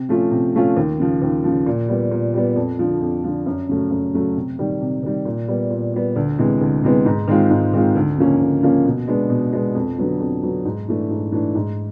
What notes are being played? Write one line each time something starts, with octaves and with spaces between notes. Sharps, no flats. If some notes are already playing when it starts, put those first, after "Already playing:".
Already playing: C3
F3 A3 C#4 F4
C3
F3 A3 C#4 F4
D#2
C#3 F3
D#2
C#3 F3
A#2
G3 B3
A#2
G3 B3
F2
D3 F3
F2
D3 F3
F#2
C#3 F#3 A3
F#2
C#3 F#3 A3
C3
D#3 G3
C3
D#3 G3
A#2
G3 B3
A#2
G3 B3
D2
C3 E3 G#3 B3
D2
C3 E3 G#3 B3
G#2
D#3 G#3 C4 F4
G#2
D#3 G#3 C4 F4
D2
C#3 F3 A#3 C#4
D2
C#3 F3 A#3 C#4
B2
G#3 B3 D4
B2
G#3 B3 D4
F2
D3 F#3 B3
F2
D3 F#3 B3
G#2
E3 A3 D4
G#2
E3 A3 D4
G#2